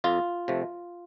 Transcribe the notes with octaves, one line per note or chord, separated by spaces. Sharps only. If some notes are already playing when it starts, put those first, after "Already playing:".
F2 F4
C3 F3 A3